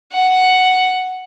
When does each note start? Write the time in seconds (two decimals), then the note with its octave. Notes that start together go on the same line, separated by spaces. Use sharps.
0.12 F#5